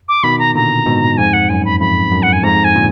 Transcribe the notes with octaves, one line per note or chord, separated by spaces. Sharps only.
D6
B2 D#3 B5
A#5
A#2 D3 A#5
G#2 B2
F2 G#2 G#5
F#5
F#2 G#5
B5
F2 B5
F#2
F#5
G#5
F2 G#2 A#5
G#5
A#2 D3